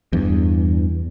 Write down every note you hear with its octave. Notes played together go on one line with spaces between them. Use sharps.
E2 G2